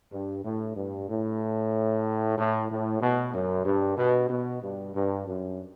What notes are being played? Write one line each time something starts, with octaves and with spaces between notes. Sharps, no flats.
G2
A2
G2
A2
A2
A2
B2
F#2
G2
B2
B2
G2
G2
F#2